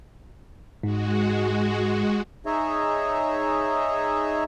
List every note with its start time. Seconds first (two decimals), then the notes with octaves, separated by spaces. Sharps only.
0.83 G#2 G#3 F#4
2.46 D#4 G#4 C#5 D#5 E5